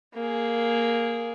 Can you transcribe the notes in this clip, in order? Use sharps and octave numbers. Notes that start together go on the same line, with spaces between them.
A#3 G#4